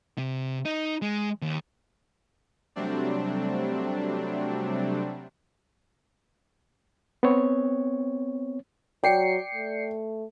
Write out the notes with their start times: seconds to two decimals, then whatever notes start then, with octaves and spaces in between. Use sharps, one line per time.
0.18 C3
0.65 D#4
1.02 G#3
1.42 D#2
2.76 C3 F#3 G3 A3 C4 D4
7.23 B3 C4 C#5
9.04 F#3 D5 G5 C7 C#7
9.55 A3